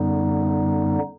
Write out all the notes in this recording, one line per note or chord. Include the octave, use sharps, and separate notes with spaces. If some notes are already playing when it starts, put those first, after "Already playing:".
Already playing: F#2 D3 G3 B3 D#4